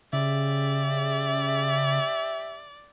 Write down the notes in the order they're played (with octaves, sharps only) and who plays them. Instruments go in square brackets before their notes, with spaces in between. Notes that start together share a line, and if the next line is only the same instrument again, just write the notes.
[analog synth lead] C#3 [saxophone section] G4 E5 [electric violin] D5